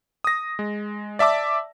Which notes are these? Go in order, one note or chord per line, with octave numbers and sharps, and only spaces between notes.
D#6 A#6
G#3
D5 E5 A5 D6 E6